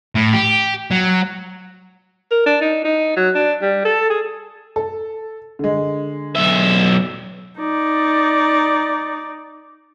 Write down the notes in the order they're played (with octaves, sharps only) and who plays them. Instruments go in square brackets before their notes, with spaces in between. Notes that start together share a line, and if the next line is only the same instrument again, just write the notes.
[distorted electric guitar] A2
G4
F#3
[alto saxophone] A#4
D4
D#4
D#4
F#3
D4
G3
A4
G#4
[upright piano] A4
D3 G#3
[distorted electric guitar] B1 E5
[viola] D#4 D5